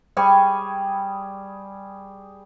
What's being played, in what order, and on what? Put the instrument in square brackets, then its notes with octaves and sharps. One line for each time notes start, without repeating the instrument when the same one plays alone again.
[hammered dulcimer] G3 G#4 G#5 C#6